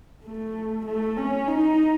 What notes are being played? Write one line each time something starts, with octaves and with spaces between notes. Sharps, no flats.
A3
A3
C#4
D#4